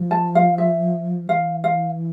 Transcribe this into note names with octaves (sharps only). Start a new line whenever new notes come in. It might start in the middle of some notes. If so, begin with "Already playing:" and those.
Already playing: F3
A5
F5
E5
E3 F5
F5